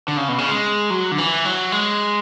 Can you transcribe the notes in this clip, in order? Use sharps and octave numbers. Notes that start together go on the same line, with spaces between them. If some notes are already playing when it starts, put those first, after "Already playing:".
D3
C#3
B2
C#3
G#3
F#3
D3
E3
F#3
G#3